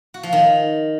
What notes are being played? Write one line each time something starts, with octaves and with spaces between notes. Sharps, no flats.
F#4
F3
D#3